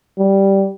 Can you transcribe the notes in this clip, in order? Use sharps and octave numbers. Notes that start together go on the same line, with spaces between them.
G3